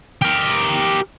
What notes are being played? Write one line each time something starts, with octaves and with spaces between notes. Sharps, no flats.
G4 A#4